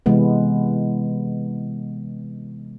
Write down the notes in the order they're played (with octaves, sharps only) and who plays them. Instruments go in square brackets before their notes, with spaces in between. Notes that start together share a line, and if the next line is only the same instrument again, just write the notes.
[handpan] C3 E3 G#3 B3